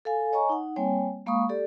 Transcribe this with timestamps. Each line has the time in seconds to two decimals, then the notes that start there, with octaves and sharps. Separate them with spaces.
0.05 A4 F5 G#5
0.33 C#5 D#5 G#5 A#5 C#6
0.49 D#4 F#5
0.76 G3 A#3 C4 C#5 G5 G#5
1.26 G#3 A#3 F5 B5 C#6 D#6
1.49 G4 A4 D5